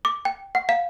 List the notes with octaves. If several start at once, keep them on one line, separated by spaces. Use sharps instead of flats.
D6
G5
F#5
F5